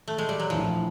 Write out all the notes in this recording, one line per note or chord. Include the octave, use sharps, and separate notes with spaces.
A3
G#3
G3
F#3
A#1 A2 E3 F3